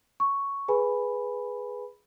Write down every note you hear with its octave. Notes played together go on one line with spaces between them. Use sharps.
C#6
G#4 B4 G#5 B5